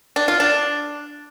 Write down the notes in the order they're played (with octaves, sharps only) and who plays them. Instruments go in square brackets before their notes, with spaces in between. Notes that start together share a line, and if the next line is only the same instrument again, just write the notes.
[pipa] D4
F4
D4